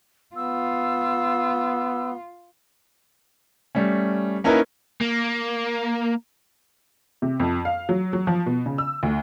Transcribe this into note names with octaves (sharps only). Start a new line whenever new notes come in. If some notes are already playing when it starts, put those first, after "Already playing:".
B3 F4 E6
G3 A3 C#4
A#3 C#4 D#4 E4 A#4 B4
A#3
C3
F2
F5
F#3
F#3
F3
B2
C#3
E6
D2